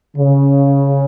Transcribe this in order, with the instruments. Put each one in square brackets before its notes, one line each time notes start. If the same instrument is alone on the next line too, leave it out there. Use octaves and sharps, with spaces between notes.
[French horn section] C#3